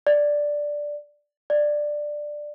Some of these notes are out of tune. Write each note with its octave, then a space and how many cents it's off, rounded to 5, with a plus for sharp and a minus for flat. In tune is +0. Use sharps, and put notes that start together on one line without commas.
D5 +0
D5 +10